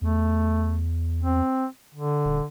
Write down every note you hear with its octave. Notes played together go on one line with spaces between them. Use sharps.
E2 A3
C4
D3
D#1